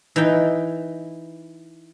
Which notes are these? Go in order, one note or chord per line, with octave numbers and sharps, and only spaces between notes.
E3 D#4 G5